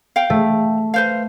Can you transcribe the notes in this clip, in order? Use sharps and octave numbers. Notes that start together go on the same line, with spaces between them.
F5 G5
A3
B4 C5 F5